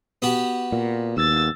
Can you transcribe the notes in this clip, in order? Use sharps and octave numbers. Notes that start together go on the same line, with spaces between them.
B3 F#4 G4
A#2
D#2 E6 A6